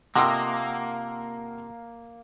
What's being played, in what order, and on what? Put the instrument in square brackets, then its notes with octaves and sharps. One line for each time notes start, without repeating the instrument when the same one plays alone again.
[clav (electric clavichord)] C3 [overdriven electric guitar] A#3 [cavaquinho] F4 A4 D#5 [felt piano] F#5 G5 E6